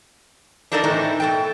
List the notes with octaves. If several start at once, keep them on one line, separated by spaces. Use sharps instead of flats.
D4 D#4 A4 A#4 D5 D#5
A2 E3 A3 C4 D#4
B2 A4 G5